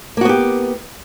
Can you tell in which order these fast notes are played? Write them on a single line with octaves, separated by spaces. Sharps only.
A#3 F#4 B3 G4